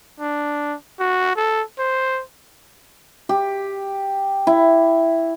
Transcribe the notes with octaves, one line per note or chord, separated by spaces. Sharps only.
D4
F#4
A4
C5
G4
E4